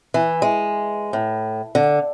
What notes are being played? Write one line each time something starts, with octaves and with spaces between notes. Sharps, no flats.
E3
G#3
A2
D3